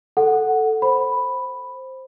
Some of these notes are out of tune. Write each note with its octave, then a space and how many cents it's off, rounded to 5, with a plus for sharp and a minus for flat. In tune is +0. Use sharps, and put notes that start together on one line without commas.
A4 +0 F#5 +0
C5 +5 B5 +0